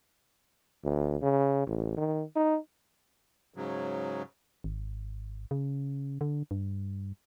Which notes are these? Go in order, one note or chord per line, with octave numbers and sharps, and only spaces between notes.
D2
C#3
A1
D#3
D#4
G#2 C#3 F#3
G#1
C#3
D3
G2